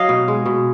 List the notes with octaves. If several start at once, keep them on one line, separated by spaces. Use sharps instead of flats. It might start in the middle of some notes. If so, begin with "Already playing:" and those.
Already playing: F#3 D#5 F5
B2
G#3
B2